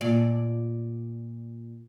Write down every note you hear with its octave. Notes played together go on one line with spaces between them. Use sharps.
A#2 D5